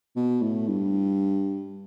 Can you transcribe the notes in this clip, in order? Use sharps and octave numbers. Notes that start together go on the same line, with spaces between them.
B2
A2
G2